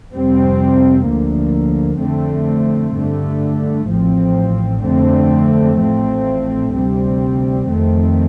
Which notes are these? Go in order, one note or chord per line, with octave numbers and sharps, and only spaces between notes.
F2 C3 G3 C4
D2 D3 F3 A#3
F2 D3 A3 C4
G2 D3 A3
A1 A2 F3 C4
F2 D3 A3 C4
A1 A2 F3 A3 C4
D2 C3 G3 C4
F2 D#3 A3 C4